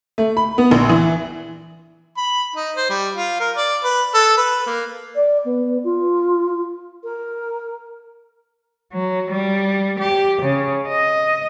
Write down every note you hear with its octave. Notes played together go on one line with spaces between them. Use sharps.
A3
B5
B3
A#1
E3
B5
D#4
C5
G3
F4
A#4
D5
B4
A4
B4
A#3
D5
B3
F4
A#4
F#3
G3
G4
C#3
D#5